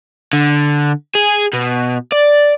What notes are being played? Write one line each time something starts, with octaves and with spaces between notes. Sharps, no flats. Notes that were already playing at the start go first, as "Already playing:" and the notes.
D3
G#4
B2
D5